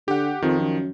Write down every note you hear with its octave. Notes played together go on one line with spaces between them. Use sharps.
D3 G4 F#5
F2 D#3 F3
F#2